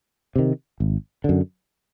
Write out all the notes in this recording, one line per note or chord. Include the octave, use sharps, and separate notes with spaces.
C3 D#3
G#1
F#2 D3